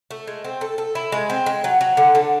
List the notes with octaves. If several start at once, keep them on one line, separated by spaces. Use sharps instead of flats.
A3
G#3
C4
A4
A4
E4
G#3
C4
G#3
F#3
F#3
D3
D3